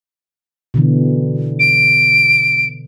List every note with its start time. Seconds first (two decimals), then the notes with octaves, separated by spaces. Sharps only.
0.74 B2 D3 E3
1.60 D7